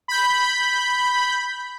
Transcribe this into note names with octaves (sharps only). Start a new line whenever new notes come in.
B5 G6